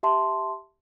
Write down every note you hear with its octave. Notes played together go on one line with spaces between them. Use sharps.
G4 E5 A5 C6